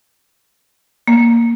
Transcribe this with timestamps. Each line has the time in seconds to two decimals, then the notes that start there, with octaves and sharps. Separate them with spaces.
1.07 A#3